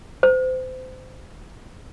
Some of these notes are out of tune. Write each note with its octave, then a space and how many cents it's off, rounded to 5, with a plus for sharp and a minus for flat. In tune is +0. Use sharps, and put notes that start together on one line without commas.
C5 -30